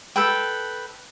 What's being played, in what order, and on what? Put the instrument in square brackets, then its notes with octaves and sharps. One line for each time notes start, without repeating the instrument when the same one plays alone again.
[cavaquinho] A4 B4 G5